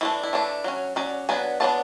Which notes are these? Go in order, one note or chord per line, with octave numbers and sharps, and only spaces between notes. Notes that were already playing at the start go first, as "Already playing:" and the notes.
E3 A3 D4 E4
E4
E3 A3 D4
F#3 C#4
F#3 C#4 D5
F#3 B3 D4 G#5
F#3 B3 D4 A5